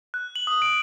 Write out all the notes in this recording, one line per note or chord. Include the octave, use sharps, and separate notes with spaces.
F#6
F#7
D#6
D7